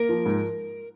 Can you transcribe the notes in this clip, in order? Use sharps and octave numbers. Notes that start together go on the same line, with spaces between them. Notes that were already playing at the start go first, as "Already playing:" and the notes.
Already playing: A#3 A#4
F3
G#2